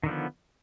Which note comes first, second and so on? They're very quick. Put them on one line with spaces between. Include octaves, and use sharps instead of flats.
D#3 D3 F3 B3